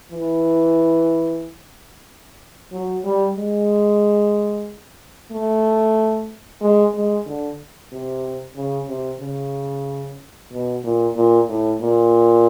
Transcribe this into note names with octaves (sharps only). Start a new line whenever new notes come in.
E3
F#3
G3
G#3
A3
G#3
G#3
D3
C3
C#3
C3
C#3
B2
A#2
A#2
A2
A#2